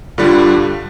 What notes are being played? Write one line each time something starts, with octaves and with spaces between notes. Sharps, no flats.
G2 D3 G3 D4 F4